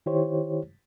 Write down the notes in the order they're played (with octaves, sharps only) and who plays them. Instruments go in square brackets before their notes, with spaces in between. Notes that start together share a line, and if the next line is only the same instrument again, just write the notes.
[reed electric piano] D#3 E4 G4 C5 C#5